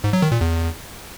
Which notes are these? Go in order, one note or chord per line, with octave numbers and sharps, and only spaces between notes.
G#2
F#3
D#3
A#2
E2